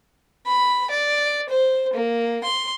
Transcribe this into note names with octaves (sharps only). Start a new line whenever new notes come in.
B5
D5
C5
A#3
C6